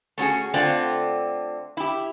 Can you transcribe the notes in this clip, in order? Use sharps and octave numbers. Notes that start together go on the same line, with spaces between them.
A3 C#4 F#4 G#4
D3 A3 C4 F4 D5 G5
E4 G4